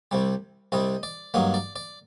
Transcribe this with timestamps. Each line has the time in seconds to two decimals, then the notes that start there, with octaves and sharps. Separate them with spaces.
0.11 C2 C3 G3
0.72 C2 C3 G3 D#5
1.03 D5
1.34 G2 F#3 A#3 D#5
1.54 D5
1.76 D5